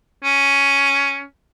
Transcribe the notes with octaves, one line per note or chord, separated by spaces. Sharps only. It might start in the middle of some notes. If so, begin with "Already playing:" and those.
C#4